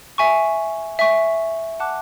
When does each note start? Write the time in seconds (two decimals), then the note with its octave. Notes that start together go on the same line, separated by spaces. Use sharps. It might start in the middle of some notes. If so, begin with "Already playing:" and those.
0.18 E5 G#5 C#6
0.99 E5 G#5 C#6
1.80 F#5 A5 D6 F#6